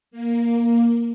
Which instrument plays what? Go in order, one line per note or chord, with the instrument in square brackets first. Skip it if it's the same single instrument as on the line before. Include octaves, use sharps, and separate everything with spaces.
[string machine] A#3